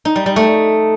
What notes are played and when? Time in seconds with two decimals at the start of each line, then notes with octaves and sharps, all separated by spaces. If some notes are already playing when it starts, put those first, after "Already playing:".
0.05 D#4
0.16 G3
0.26 G3
0.36 A3